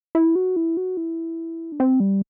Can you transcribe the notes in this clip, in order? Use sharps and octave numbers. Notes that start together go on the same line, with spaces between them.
E4
F#4
E4
F#4
E4
D4
C4
G3